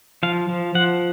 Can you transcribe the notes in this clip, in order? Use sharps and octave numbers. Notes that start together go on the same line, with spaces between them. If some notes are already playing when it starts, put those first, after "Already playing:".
F3 F5
F3
F3 F#5